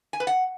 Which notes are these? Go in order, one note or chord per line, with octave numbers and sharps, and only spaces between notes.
G#5
B4
F#5